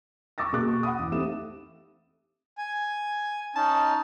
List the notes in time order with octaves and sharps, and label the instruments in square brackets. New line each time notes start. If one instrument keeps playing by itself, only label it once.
[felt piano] C#6 D6 E6 A6 A#6
B2 A#3 G#4 D6 F#6
C#6
F#5 B5 D#6
E2
A3 C4 D#4 G4 E5 E7
[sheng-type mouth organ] G#5
[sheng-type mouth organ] C#4 D#4 [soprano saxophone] A5